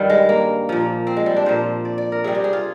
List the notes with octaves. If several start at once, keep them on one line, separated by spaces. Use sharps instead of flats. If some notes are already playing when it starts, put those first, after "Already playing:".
Already playing: G2 D#3 G3
G#3
A#3
A#2 F3
C4
G#3
G3
D4
A#2 F3 C5
D5
D5
A#4
C3 G3 G#4
G4
G#4
F4